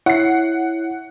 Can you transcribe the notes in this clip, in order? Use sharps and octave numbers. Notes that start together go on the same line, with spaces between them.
E4 C#5 F#5 C7